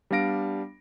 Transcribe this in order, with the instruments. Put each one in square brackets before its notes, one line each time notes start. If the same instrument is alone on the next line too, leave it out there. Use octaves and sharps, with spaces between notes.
[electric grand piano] G3 B3 D4 F5 A#6 D7